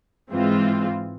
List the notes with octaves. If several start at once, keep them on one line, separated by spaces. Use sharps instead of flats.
G#2 E3 G#3 C4 F4